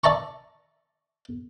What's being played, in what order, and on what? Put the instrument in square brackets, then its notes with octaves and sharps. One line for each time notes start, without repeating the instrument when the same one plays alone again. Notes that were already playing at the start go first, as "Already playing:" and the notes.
[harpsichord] D5 E5 A5 A#5 C#6